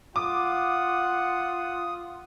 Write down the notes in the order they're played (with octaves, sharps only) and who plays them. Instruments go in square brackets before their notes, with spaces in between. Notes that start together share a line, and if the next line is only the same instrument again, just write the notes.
[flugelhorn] F4 [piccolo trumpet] F#5 [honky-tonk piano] D6 [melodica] D#6